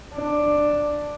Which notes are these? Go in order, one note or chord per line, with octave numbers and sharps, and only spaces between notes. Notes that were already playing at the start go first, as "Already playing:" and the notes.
D4